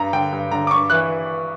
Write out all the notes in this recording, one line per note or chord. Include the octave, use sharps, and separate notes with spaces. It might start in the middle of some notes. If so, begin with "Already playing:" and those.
Already playing: G2 A#5
D3 G5
G2
D3 A#5
D6
G2 C#6
E3 F#6